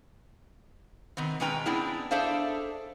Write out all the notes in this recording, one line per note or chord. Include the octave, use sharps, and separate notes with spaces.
C3 D#3 B3 C4
B2 G#3 C#4 B4 G5 A#5
B3 C4 D4 E4 G#4
D4 G#4 A4 C5 E5 F5